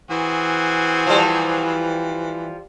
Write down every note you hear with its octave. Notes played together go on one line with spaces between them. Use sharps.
E3 C4 F#4 G#4
F3 G3